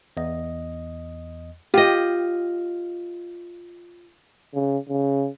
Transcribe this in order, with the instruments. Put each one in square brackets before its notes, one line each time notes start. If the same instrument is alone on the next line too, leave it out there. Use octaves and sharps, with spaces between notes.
[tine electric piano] E2 D#5
[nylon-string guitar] F4 D#5 [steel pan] G4
[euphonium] C#3
C#3